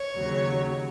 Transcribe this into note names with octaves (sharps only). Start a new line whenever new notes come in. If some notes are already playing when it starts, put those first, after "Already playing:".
Already playing: C#5
D#2 C#3 F#3